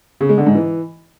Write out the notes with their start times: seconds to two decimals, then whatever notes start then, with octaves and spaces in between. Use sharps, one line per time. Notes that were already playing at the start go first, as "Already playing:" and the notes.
0.21 C#3
0.29 G#3
0.38 D3
0.46 G#2
0.55 E3